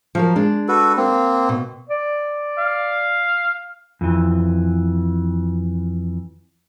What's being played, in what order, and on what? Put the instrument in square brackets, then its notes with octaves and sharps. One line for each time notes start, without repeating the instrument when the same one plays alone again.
[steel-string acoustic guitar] F3 F#3 A#4
G#3 D4
[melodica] F#4 A4 B4
A#3 C4
[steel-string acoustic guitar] B2
[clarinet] D5
[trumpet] F5
[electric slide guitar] F2 E3